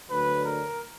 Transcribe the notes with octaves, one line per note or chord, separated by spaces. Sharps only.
D2 D3 F#3 B4
A#4